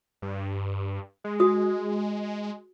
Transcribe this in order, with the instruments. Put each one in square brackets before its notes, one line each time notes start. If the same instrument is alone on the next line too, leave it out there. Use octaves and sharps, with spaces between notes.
[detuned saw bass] G2
G#3
[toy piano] F#4 D#6